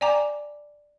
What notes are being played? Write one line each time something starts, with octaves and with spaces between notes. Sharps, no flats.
D5 G5 G#5 A#5 D6